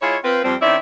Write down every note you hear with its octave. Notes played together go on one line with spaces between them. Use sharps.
G#3 E4 F4 C#5
C4 F4 B4
F2 G3 C4
D#3 C4 C#4 E4 D5 E5